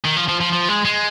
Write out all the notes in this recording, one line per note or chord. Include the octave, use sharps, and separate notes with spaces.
D#3
F3
F3
F3
F3
G#3
G#3